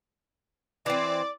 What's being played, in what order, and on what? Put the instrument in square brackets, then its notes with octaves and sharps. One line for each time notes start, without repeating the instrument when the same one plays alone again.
[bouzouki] E3 C4 [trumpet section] D5